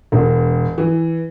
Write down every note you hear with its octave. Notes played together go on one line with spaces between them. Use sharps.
E1
E3